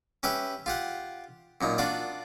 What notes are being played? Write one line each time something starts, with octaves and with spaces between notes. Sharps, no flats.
C#4 G4 B4 E5 G5
F4 G4 F#5
F#2 A#2 D#4
D4 F4 F#4 D5